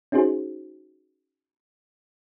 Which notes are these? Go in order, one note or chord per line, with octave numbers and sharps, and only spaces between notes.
C#4 D#4 F#4 G#4 C5